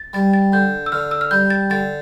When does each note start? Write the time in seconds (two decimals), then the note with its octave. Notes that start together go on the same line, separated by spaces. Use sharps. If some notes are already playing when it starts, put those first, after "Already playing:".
Already playing: A6
0.13 G3 A6
0.33 A6
0.52 D3 G6
0.86 E6
0.92 D3 F6
1.11 E6
1.21 F6
1.31 G3 G6
1.50 A6
1.70 D3 A6